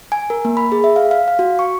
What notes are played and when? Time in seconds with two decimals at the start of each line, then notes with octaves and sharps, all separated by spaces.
0.12 G#5
0.30 A#4
0.45 A#3
0.57 B5
0.72 G#4
0.84 E5
0.96 F5
1.11 F5
1.28 F5
1.39 F#4
1.59 C#6